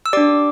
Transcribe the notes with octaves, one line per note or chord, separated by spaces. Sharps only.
E6
D4 G4 D5 D6